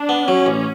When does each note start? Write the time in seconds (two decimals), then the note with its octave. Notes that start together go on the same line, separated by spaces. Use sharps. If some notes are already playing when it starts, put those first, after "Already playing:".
Already playing: D4
0.09 B3
0.28 F#3 C#4
0.46 A1